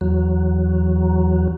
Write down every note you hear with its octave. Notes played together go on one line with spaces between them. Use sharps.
E2 F#3